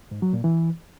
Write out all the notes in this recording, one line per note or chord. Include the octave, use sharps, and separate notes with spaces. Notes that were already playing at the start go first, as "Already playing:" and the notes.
G#2
F#3
A#2
E3